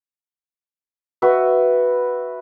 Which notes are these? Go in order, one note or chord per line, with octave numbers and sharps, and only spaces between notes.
F#4 B4 E5